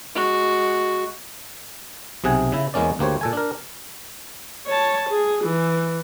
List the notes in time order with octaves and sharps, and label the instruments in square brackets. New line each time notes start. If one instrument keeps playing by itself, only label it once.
[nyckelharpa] G#3 F#4
[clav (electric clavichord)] B1 C3 G#4 F#5 G#5
C#3 E4
E2 G#3 A#3 C#4 D5
D2 A#3 G4 C5 C#5
A#2 A4 G#5
D4 A#4
[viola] C#5 A5
G#4
E3